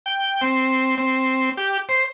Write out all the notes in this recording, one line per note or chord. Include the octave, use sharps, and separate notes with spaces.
G5
C4
C4
G4
C5